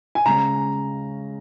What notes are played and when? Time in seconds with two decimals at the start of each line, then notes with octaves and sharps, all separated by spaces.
0.15 G#5
0.25 C#3 G#3 C#4 A#5